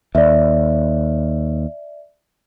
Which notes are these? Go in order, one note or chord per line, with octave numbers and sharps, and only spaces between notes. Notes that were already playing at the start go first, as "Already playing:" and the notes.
D#2 D5 E5